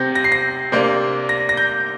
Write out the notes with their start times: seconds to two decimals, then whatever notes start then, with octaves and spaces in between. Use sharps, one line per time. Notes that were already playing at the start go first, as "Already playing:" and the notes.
Already playing: C3 C4 G6 A#6
0.15 A#6
0.24 C7
0.32 A#6
0.72 C3 A#3 D4
1.29 A#6
1.49 A#6
1.57 G6